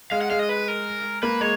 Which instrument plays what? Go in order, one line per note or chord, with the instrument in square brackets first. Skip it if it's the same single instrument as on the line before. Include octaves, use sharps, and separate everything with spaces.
[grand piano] G#3 [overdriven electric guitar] F5
[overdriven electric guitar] F#5
[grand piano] G#3 [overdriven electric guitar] F5
[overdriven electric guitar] D#5
B4
A#4
[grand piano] A#3 [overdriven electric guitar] B4
[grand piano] G#3 [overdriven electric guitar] C#5